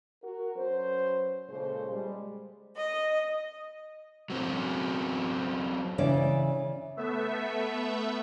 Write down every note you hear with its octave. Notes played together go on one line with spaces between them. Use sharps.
F#4 A#4
F#3 C#4 B4 C5
A#2 C#3 G#3 A4 C5
G3 G#3
D#5
F#3 C4 C#4
C#3 E3 D5
A3 B3 E5